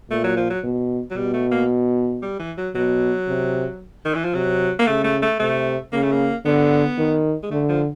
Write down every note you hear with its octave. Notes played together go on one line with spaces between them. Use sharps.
A#2 A3
F#3
F3
F#3
B2
F#3
B2 G3
A3
A#3
G3
E3
F#3
B2 F#3
C3
D#3
E3
F3
C3 F#3
A#3
C#3 A3
A3
A3
C3 A3
C#3 A#3
A3
A#3
D3 B3
D#3
G#3
D3 A3
F3